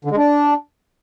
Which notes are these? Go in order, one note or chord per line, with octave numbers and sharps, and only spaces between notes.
D3
G#3
D4